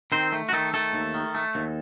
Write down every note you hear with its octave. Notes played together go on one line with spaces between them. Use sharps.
D#3 C4 C5
A3
F#4
D#3 A3 A4
D#3 A3 A4
D#2
D#3
A3
D#2